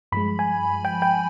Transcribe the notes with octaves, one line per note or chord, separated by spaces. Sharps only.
G2 F3 G#3 B5
G#5
G5
G5